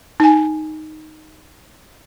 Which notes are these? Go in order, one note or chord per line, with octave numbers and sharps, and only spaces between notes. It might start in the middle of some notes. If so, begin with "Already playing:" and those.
D#4 G#5